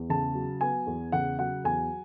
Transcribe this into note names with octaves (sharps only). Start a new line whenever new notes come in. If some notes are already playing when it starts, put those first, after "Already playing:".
Already playing: E2
C#3 A5
F#3
B3 G#5
E2
C#3 F#5
F#3 F#5
E2 G#5